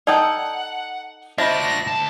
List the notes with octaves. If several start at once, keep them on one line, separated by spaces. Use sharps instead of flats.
D#4 A4 D5 F#5 G5 A5 D#6
F3 D4 F#4 D#5 E5 B5 A#6
D2 A5